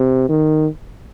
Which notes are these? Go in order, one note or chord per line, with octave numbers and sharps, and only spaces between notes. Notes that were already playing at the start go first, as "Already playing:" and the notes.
Already playing: C3
D#3